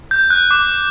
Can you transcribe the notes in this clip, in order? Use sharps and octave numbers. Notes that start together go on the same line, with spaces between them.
G6
F#6
D6